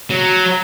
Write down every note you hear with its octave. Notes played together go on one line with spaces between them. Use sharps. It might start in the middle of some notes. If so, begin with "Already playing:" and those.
F#3